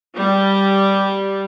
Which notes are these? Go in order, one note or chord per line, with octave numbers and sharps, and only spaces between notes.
G3